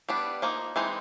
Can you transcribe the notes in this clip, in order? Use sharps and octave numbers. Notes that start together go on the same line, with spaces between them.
G3 B3 D4
F3 A#3 D#4
E3 G#3 C4 D#4